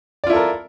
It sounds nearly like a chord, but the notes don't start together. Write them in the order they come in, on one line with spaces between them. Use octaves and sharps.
D5 F4 E4 A4 A#4